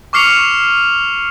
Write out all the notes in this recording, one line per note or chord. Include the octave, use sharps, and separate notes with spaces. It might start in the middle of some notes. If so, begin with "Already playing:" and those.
C#6 D6 F6 C7 C#7 F7